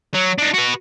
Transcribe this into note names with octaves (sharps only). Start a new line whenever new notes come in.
F#3
D4 D#4
F#4 B4